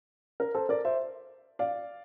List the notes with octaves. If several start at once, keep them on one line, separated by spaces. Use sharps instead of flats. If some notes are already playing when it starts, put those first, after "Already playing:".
A#4
A4 C5
A#4 D5
C5 E5
D5 F5